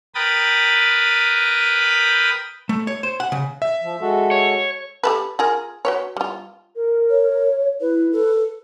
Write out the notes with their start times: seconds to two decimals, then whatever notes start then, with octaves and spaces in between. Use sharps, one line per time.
0.15 A#4 B4 G5 B5 D#6 A6
2.69 A3
2.87 C#5
3.03 C5
3.20 F#5
3.32 C#3
3.62 E5
3.82 F3
4.01 G#3 F#4 A4
4.31 C#5
5.03 G4 A4 B4
5.39 F4 G#4 A#4
5.85 F#4 B4 C#5
6.17 G3 F4
6.76 A#4
7.10 C#5
7.81 E4 B4
8.12 A4